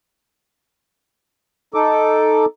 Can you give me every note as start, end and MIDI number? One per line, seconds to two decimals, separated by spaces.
1.74 2.45 63
1.74 2.45 69
1.74 2.45 86